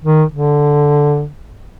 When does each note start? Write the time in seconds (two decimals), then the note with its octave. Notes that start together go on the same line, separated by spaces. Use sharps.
0.04 D#3
0.32 D3